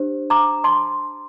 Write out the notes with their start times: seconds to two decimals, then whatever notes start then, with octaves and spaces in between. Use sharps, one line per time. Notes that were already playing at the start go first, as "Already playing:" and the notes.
Already playing: D4 G4 C5
0.30 A#5 D6
0.64 A5 C6